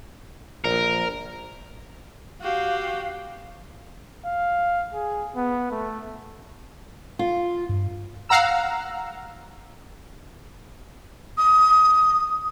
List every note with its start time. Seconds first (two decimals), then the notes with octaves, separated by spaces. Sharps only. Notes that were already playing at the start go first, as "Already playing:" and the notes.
0.64 A#1 A#4
2.41 F#4 G4 F5
4.25 F5
4.94 G#4
5.36 B3
5.71 A3
7.19 F4
7.69 G2
8.29 F5 F#5 A#5 E6
11.38 D#6